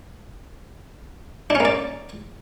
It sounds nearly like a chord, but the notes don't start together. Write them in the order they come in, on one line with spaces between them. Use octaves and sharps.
D4 C#4 A#3 D5